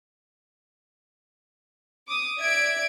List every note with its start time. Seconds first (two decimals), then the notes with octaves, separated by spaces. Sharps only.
2.08 D6 D#6
2.39 D5 E5 G#6 D7